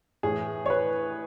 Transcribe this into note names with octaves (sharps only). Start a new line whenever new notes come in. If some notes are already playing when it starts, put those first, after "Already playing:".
A2 E3 G#4
C#5
B4